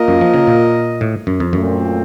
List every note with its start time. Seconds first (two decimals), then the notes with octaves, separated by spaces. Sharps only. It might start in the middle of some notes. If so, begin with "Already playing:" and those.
Already playing: A#3 F4 A#4 D#5
0.08 F#2
0.21 F3
0.34 C#3
0.47 A#2
1.01 A2
1.27 F#2
1.40 F2
1.53 F#2 A#2 A3 C4